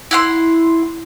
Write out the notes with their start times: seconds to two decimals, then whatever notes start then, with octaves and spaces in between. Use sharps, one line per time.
0.11 E4 F#5 C6